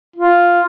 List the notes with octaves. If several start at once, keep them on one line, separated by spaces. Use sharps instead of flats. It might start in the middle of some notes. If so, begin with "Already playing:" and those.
F4